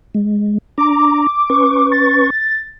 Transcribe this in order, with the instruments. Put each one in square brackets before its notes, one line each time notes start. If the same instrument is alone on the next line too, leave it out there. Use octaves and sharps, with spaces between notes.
[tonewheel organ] G#3
[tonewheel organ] D4 A#5 [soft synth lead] D6
[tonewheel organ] C#4 B4 C#6
[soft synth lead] A6